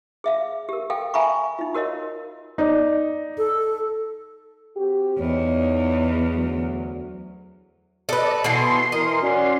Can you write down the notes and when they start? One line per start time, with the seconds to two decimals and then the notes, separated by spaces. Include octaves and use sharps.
0.24 G#4 E5 F5
0.69 G4 A#4
0.90 A4 F5 G5
1.14 E5 F5 G#5 A#5 B5 C#6
1.59 D#4 F4
1.74 F#4 A#4 C#5 D#5 F5
2.58 D#4 D5
3.38 A4
4.77 C4 F#4 G4
5.19 E2 D#4 C#5
6.34 D2 F#3
8.09 A4 B4 D5 D#5
8.44 B2 E3 B3 C6
8.92 E3 A#4 D#5
9.22 C#4 F#4 D5